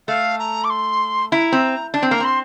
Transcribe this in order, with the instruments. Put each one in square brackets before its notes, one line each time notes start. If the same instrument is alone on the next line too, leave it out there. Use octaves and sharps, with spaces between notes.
[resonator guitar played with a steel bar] A3 [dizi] F5
[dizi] A#5
D6
C6
[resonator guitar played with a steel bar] E4 [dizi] A#5
[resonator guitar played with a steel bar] C4
[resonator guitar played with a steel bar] D4 [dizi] A5
[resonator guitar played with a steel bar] C4
[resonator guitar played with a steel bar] A#3 [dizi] A#5
[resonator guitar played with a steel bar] C4 [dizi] C6